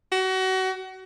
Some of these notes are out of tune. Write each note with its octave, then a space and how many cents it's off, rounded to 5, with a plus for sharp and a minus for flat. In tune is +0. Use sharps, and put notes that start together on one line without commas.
F#4 +30